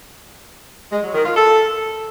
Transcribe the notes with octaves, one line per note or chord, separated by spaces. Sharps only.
G#3
F#3
D#3
F4
A4